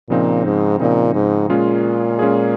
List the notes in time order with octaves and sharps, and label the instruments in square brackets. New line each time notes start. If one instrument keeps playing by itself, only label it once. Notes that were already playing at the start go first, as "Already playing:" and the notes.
[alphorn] A#2 [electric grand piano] C#3 F3 C4 D#4
[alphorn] G#2
[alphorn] A#2 [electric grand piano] C#3 F3 C4 D#4
[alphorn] G#2
[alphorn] A#2 [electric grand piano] G#3 C#4 F4 G#4
[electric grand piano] G#3 C#4 F4 G#4